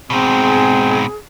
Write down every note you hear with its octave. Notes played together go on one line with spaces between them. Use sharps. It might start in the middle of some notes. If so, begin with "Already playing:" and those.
G#2 B2 C4 G#4